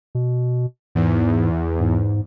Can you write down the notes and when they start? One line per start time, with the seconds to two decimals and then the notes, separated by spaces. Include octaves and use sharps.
0.15 B2
0.95 E2 G#2
1.80 G#2